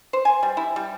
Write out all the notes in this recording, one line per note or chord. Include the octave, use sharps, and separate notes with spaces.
C5
G#5
G3
E4
G3